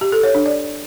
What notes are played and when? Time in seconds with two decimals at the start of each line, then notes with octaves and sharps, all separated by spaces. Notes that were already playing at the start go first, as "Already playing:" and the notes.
0.01 G4
0.12 A4
0.23 C#5
0.35 D4
0.46 D5